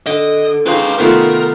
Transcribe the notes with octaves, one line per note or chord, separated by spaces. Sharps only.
D3 D#5
C#3 C4 D#4 B4 C5 F5
C3 D#3 A3 B3 F4 A#4 C5